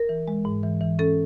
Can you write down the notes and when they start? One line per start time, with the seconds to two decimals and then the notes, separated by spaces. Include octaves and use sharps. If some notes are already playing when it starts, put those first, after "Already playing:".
Already playing: A#4
0.09 E3
0.28 G#3
0.45 G#2
0.63 E3
0.81 E3
0.99 C#4 A4